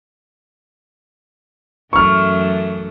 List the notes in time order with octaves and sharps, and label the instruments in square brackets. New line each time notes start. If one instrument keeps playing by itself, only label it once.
[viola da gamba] F#2 E3 A3 [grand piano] C#6 F6